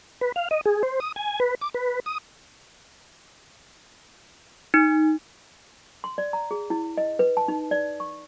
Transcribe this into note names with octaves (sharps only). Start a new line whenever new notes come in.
B4
F5
D#5
G#4
C5
D#6
G#5
B4
D6
B4
D#6
D#4
C6
D5
A#5
G#4
E4
D#5
B4
A5
D#4
D5
C#6